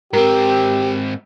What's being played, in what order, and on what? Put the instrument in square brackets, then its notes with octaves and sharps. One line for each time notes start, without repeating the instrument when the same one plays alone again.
[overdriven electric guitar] G#2 C4 [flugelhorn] G4 [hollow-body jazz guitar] A#4